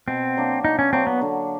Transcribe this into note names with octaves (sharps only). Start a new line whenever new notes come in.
B2 C4
F#3 A#3 D4
B2 D#4
C#4
F#3 A#3 C4 D4
B3
D3